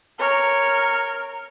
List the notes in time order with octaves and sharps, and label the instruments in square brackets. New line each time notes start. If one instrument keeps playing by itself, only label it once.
[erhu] A#4 [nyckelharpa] C#5